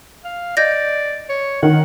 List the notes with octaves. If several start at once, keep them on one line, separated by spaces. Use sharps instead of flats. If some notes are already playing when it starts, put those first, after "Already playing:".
F5
D5 D#5 G6 A#6
C#5
D#3 F#5